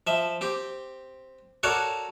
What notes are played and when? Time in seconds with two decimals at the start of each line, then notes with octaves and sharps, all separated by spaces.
0.07 F3 E5
0.41 C4 G4
1.63 F#4 A4 A#4 C#5 D5 F#5